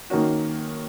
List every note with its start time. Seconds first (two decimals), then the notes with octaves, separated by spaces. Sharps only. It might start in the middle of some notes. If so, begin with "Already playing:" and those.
0.10 D#3 A#3 C#4 F#4